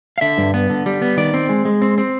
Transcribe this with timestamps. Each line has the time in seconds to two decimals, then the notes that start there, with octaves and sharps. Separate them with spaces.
0.18 F5
0.21 D3 E5
0.38 G2
0.54 B3
0.70 D3
0.86 G3
1.02 B3
1.17 D#3 D5
1.34 C4
1.49 G#3
1.65 G#3
1.82 C4
1.98 C4